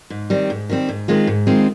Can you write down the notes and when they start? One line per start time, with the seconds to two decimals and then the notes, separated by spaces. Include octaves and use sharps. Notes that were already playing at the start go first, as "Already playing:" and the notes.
0.10 G#2
0.30 D#3 G3 C4
0.50 G#2
0.70 D#3 G3 C4
0.89 G#2
1.08 D#3 G#3 C4 F4
1.27 G#2
1.47 D#3 G#3 C4 F4